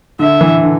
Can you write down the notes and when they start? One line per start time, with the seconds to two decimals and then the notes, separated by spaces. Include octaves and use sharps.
0.19 D3 E5
0.41 E3
0.63 D3